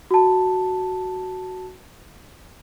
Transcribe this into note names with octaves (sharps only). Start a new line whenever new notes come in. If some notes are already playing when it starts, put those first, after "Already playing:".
F#4 A5